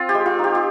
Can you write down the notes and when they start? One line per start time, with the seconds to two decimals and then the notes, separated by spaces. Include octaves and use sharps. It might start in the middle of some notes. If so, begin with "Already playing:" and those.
Already playing: C4 F4
0.09 G4
0.15 G#3
0.26 F4
0.39 D#4
0.44 G4
0.55 G4